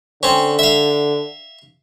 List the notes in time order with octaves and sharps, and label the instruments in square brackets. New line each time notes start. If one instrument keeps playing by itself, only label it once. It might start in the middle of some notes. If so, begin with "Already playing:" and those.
[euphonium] D3 [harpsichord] C4 C#4
[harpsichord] E5 F5